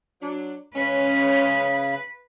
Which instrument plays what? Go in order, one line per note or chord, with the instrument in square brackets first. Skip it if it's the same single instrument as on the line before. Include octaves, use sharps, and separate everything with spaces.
[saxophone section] F#3 D4
[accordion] C#3 [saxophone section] G#3 C#4 [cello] B4